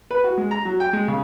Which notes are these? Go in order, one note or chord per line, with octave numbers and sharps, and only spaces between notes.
B4
F#4
G#3
A#5
F#3
G5
G#3
C#3